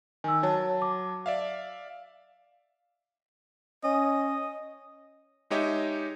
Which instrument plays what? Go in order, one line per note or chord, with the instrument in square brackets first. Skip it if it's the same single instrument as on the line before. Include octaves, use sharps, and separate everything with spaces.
[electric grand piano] D#3 [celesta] G#5 E6
[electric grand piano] F#3 A5 [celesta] C#5
[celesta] D6
[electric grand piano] D5 E5 F5
[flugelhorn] C#4 [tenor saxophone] D#5
[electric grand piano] G#3 D#4 G4 C#5 D#5 E5